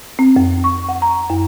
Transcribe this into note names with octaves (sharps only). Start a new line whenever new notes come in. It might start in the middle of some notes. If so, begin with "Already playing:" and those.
C4
F2
C#6
F#5
A#5
F#2